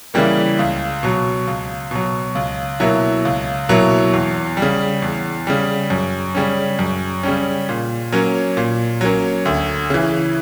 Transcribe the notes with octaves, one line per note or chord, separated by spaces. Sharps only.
C#3 E3 G3 A#3
C#2
B2 F#3
C#2
B2 F#3
C#2
B2 F#3 A#3 E4
C#2
B2 F#3 A#3 E4
E2
G3
C#3
E2
C#3 G3
F#2
C#3 G3 C#4
F#2
C#3 G3 C#4
A#2
F#3 A#3 C#4
A#2
F#3 A#3 C#4
D2
C#3 E3